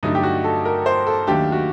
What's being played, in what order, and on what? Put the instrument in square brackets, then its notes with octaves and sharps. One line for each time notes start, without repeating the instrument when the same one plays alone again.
[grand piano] G2 D3 F#3 A3 D4 [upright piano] D#4
[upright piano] G4
F#4
A4
A#4
C5
A4
[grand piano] D#2 D#3 F#3 A3 D4 [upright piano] G4
[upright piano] F#4